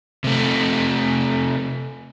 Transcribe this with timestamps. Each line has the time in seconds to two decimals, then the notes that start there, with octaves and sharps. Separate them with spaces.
0.24 C3 A3